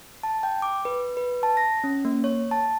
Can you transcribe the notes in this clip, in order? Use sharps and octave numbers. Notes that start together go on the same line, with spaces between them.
A5
G5
D6
B4
B4
A5
A#6
C#4
A#3
C#5
A5